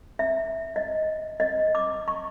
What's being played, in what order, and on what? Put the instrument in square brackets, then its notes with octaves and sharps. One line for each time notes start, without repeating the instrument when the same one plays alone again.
[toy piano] E5
D#5
D#5
D6
C#6